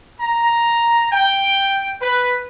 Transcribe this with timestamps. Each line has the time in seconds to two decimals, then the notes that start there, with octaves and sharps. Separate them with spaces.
0.20 A#5
1.12 G5
2.01 B4